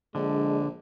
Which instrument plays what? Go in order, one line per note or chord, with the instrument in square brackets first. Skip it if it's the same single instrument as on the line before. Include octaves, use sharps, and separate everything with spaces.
[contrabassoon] A#1 [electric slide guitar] D3 [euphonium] G#3